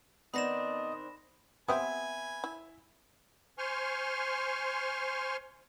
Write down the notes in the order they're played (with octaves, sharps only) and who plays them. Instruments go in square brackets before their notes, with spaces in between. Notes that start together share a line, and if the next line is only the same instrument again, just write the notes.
[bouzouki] D#3 C4 D4 [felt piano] B3 [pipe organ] D#5 [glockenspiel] B5 A#6 E7
[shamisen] B3 C4 G4 [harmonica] B4 G#5 [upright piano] E5
[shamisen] E4
[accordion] C5 G#5 C6 C#6 F6